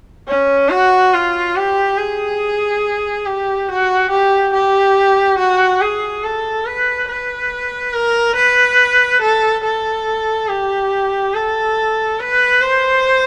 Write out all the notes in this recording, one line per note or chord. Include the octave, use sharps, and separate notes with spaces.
C#4
F#4
F4
G4
G#4
G4
F#4
G4
G4
F#4
G#4
A4
B4
B4
A#4
B4
A4
A4
G4
A4
B4
C5